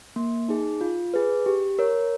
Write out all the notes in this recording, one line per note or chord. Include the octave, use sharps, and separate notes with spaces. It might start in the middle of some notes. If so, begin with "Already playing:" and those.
A#3
D#4 G#4
F4
G#4 B4
G4
A#4 C#5